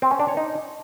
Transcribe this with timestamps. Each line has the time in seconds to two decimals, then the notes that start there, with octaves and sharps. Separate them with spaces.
0.02 C4
0.11 C#4
0.20 D4
0.28 C#5
0.37 D#4